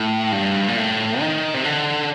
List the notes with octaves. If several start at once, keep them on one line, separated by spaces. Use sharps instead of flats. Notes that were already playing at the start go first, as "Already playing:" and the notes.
Already playing: A2
G2
A#2
A2
D#3
C3
D3